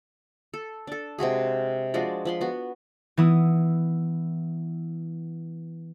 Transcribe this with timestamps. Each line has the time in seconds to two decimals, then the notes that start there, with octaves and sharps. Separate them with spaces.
0.54 A4
0.87 D4 A4
1.19 C3 G#3 F#4 G#4
1.94 F3 G#3 D4 F#4
2.25 F3 B5 C6
2.41 B3 F#4
3.17 E3 B3 E4 D#6